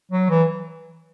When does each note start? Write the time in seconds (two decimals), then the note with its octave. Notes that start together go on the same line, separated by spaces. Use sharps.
0.11 F#3
0.30 E3